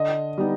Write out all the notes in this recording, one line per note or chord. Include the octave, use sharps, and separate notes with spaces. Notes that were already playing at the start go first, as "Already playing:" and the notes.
Already playing: D3 D#5
G3 B3 D#4